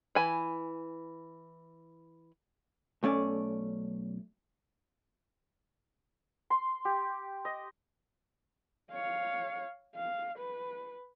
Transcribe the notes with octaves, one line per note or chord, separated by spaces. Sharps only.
E3 G#5 B5
B1 A3 C#4 D5
C6
G4
D#5
C#5 F5
F5
B4